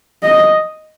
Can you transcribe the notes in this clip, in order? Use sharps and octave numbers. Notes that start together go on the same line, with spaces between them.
D#5